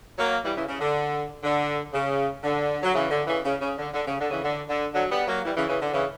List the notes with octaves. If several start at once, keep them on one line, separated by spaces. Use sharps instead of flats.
F#3 A#3
E3 G3
C#3 E3
C#3
D3
D3
C#3
D3
F#3
C#3 E3
D3
C#3 E3
C#3
C#3
D3
D3
C#3
D3
C#3 E3
D3
D3
D3 F#3
G3 B3
F#3 A#3
E3 G3
C#3 E3
C#3 E3
D3
C#3 E3